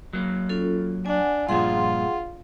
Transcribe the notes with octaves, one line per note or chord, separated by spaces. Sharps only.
F#3 A#3
C#4 F4 A4
D4 F#5 G#5
G2 A#2 F3 F4 G#4 F#5 C6